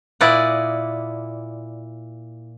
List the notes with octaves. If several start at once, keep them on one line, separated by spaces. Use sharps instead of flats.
A#2 E4 D5 D#5 F#5